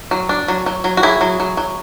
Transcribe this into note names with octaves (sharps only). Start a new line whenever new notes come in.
F#3
D4
F#3
F#3
F#3
F#4
F#3 E4 G#4
F#3
F#3
F#3